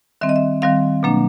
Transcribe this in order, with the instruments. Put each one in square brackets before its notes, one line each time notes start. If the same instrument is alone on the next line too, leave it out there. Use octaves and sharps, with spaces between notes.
[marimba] D#3 G3 C4 E5
D#5
E5
D#3 G3 C4 F5
B2 F#3 A#3 D4